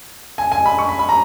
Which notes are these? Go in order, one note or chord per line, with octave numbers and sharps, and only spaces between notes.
G#5
G#5
B5
C#6
B5
B5
A#5